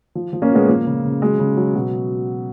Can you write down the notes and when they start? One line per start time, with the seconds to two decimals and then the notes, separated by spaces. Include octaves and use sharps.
0.15 F3
0.33 F3
0.42 A#3 C#4
0.50 A#2 G#3 B3
0.68 F3 A#3
0.86 C#3
1.04 C#3
1.21 F#3 G#3
1.39 C#3
1.57 F#3
1.75 B2